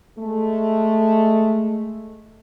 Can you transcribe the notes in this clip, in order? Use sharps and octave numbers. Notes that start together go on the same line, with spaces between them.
G#3 A3